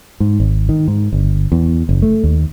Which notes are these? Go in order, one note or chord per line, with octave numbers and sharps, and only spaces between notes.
G#2
G#1
D#3
G#2
G1
E2
F#1
A3
D#2